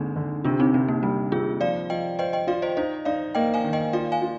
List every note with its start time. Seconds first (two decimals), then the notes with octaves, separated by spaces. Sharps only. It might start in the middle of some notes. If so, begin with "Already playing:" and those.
Already playing: D3 G#3 A#3 C4 D4 D#4
0.16 D3
0.44 C3 D4 F4
0.60 C4 D#4
0.74 C3 C4
0.88 A#3
1.03 G3 C4
1.32 C3 F4 G#4
1.61 F3 D5 F5
1.90 F3 D#5 G5
2.19 C5 D#5 G5
2.33 D#5 G5
2.47 F4 D5 F5
2.62 C5 D#5
2.77 D#4 C5 D#5
3.05 D#4 D5 F5
3.35 A#3 D#5 G5
3.54 F5 G#5
3.64 D#3
3.73 D#5 G5
3.93 F4 D5 F5
4.12 F5 G#5
4.22 F4